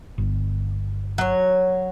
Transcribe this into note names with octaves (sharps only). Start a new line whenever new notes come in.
G1
F#3 C#5